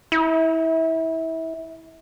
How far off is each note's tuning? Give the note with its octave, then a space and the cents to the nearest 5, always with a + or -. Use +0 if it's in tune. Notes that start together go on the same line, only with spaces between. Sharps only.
E4 -25